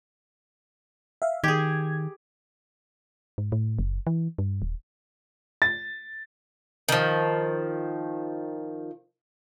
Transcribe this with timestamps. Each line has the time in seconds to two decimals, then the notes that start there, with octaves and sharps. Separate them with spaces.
1.22 E5 F5
1.44 D#3 G4 G#4 G#6
3.38 G#2
3.52 A2
3.79 F#1
4.07 E3
4.38 G2
4.62 D#1
5.62 A6
6.89 D#3 F3